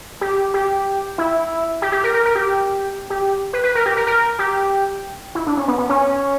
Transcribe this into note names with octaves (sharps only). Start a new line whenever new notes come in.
G4
G4
E4
G4
G4
A#4
A#4
A#4
G4
G4
B4
B4
A#4
G4
A#4
A#4
G4
E4
D4
C#4
B3
B3
C#4